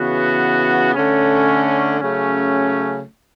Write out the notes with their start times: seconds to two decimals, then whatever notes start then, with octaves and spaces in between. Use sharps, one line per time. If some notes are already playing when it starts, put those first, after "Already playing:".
Already playing: C#3 E3 B3 F#4
0.94 D3 A3 C#4
2.00 C#3 F#3 A3 C#4